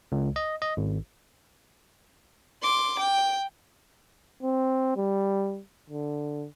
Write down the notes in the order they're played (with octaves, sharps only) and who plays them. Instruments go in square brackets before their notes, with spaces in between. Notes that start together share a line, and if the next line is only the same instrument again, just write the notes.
[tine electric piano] C#2
D#5
D#5
G#1
[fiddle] C6 D6
G5
[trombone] C4
G3
D3